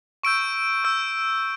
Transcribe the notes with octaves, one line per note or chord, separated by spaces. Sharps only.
C#6 E6 G6 D7
C#6 E6 G6